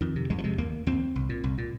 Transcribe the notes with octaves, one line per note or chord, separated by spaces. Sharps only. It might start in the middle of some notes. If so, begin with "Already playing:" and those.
F2 D#3
C3
F2 G#3
F3
C3 G#3
D#2 A#3
D#2 C4
C2
A#2
C2
A#2